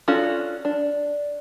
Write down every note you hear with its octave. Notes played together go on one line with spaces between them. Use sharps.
C#4 D4 F4 F#4 A4
D4